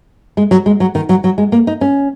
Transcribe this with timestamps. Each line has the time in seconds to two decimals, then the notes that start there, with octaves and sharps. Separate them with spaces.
0.37 G#3
0.51 F#3
0.66 G#3
0.80 F#3
0.95 D#3
1.09 F#3
1.24 F#3
1.38 G#3
1.52 A#3
1.67 D#4
1.81 C#4